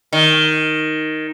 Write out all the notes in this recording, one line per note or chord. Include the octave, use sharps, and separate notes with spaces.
D#3